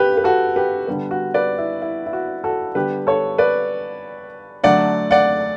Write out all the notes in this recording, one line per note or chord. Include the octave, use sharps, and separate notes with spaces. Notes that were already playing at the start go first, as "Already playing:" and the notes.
Already playing: G4 B4
B4
F#4 A4
G4 B4
D3 G3 B3
F#4
B4 D5
E4
E4
E4
F#4
F#4 A4
D3 G3 B3 G4 B4
A4 C#5
B4 D5
D3 F#3 A3 D5 F#5
D5 F#5